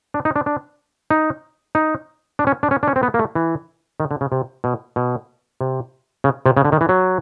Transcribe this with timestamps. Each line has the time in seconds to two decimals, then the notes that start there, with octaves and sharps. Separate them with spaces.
0.14 D4
0.25 D#4
0.36 D4
0.46 D4
1.10 D#4
1.75 D#4
2.39 D4
2.47 C#4
2.63 D4
2.71 C#4
2.83 D4
2.88 C#4
2.96 C4
3.03 B3
3.14 A#3
3.19 A3
3.35 E3
4.00 D#3
4.11 D3
4.21 C#3
4.32 C3
4.64 B2
4.96 B2
5.61 C3
6.24 C#3
6.46 C3
6.57 C#3
6.65 D3
6.72 D#3
6.81 E3
6.89 F#3